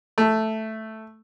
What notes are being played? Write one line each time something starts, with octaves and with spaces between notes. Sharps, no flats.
A3